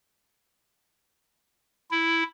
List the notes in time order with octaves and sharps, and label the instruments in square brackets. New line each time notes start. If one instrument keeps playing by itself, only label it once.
[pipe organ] E4